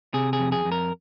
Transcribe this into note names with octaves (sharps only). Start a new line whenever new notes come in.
C3 G#4
G#4
F2
G#4
F2
A#4